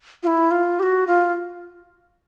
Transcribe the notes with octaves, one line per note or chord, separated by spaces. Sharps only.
F4
E4
F4
G4
F#4
F4